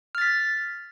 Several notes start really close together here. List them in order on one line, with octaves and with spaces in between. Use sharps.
F6 A6 B6